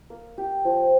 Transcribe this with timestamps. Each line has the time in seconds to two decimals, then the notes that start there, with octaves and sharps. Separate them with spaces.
0.10 A#3
0.38 G4
0.65 F3